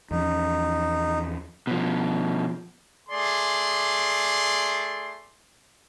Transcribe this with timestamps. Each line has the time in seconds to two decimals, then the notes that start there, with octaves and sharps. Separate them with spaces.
0.11 E2 F3 C#4 D#4
1.67 B2 F3
3.10 A3 G#4 D5 C6